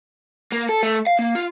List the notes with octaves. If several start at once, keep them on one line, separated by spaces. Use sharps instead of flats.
A#3
A4
A3
F5
A#3
F4